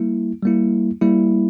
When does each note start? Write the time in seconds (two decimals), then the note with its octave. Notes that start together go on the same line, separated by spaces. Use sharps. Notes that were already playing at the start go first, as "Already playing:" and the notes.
Already playing: G3 A#3 E4
0.43 G3 A#3 E4
1.02 G3 A#3 E4